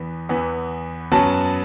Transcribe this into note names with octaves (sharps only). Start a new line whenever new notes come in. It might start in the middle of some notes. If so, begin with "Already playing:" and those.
Already playing: E2 E3 B3
E2 E3 B3
F#2 F#3 B3 A5